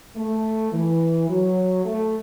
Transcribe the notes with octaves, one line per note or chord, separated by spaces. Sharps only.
A3
E3
F#3
A3